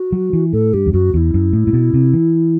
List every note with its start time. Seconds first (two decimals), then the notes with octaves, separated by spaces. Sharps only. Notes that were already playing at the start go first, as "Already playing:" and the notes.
Already playing: F#4
0.12 F#3
0.33 E3
0.52 A2 A4
0.74 G2 G4
0.86 E2
0.93 F#2 F#4
1.13 E2 E4 F#4
1.34 F#2
1.53 A2
1.67 A2
1.73 B2
1.93 C3
2.13 E3